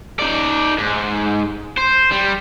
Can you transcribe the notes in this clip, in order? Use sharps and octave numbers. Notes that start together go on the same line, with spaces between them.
D#4 D5
G#2
C5
G3